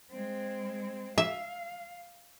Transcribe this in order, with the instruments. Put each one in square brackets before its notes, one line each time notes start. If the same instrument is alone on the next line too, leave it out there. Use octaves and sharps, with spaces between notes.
[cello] G#3 C4
[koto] E5 [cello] F5